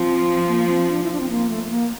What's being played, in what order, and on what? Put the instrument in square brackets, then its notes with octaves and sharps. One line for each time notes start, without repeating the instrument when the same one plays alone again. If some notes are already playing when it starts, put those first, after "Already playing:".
Already playing: [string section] F3 [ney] C4
[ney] A#3
C4
D4
E4
D4
C4
A#3
A3
A3
A#3